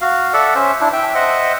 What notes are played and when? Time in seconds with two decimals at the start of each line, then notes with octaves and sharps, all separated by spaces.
0.01 F#4 F5
0.33 A4 D5 E5 F#5
0.55 C#4 C5 E5
0.81 D4 E4
0.93 E5 G5
1.15 C5 D#5 E5 F#5